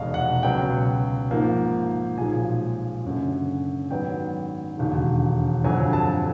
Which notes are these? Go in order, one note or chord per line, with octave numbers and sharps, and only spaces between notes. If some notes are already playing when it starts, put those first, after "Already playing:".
Already playing: F1 E2 B2 G#3 D#5 F5
F#5
C#2 B2 F#3 G5
G#2 F3 A#3
B1 A#2 F3 G#3 G#5
F#1 F#2 D3
G#2 D#3 F#3 B3 D4 G5
E1 D#2 D3
G1 F2 D3 F#3 G#5
A5